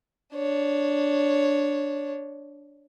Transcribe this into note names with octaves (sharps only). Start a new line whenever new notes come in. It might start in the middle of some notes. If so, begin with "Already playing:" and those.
D4 C#5